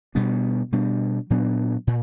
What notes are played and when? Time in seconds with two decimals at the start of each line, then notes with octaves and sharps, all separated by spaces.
0.15 B2 G3 B3 D4
0.72 B2 G3 B3 D4
1.30 A#2 F#3 B3 D4
1.87 A#2